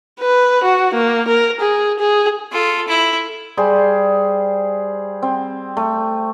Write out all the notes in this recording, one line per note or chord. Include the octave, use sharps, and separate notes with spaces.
B4
F#4
A#3
A#4
G#4
G#4
F4 A4
E4
G3 G#4 C5
C4
A3